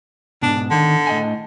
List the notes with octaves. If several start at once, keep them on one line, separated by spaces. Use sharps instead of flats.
G#2 B2 D4
D3 D#3
A2 D#5 G#5